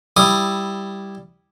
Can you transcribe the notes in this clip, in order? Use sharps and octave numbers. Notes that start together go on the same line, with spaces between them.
G3 E4 D#6